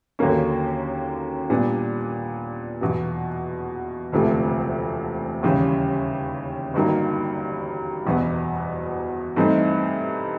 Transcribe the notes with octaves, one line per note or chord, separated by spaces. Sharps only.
D#2 D3 F#3 A#3 C#4
A#2 G3 B3 D4
E2 B2 F#3 B3
E1 D2 C3 F3 A3
D#2 C#3 E3 G3
G1 G2 D#3 F#3 A#3
F#1 E2 B2 F#3 B3
G2 E3 A3 C4 D#4